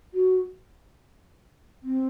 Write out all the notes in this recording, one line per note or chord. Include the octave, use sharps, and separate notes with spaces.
F#4
C4